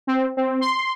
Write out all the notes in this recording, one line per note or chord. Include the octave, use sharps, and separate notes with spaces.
C4
C4
C6